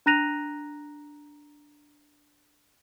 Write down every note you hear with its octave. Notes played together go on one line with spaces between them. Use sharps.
D4 A#5 F#6 A#6 D#7 F7